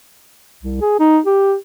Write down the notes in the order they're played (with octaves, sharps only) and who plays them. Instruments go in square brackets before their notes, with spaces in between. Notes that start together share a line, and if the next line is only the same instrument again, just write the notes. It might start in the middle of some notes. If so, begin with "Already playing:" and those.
[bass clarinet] C2
G#4
D#4
G4